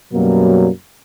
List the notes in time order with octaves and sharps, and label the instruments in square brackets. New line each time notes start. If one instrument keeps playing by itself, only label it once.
[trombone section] F#2 B2 F#3 G3 A#3